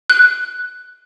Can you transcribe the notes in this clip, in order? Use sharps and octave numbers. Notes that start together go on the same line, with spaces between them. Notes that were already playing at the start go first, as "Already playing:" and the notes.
F#6